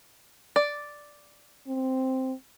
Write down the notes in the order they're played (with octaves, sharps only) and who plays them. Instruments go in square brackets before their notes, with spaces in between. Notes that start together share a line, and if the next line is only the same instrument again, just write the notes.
[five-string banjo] D5
[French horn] C4